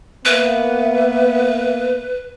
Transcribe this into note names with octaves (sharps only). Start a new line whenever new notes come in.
A#3 B3 B4 E5